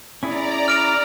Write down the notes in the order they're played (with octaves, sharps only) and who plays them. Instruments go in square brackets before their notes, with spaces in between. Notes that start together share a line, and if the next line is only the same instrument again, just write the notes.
[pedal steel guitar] C#4 E4 G#4 [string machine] D5 A#5
[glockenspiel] F6 D7 F7